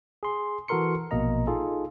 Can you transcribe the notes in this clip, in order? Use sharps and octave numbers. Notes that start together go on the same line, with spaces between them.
G#4 C6
E3 F#4 A4 A#4 C6 C#7
A#1 B2 A#3 D#5 A#5
D#4 F4 G#4 A4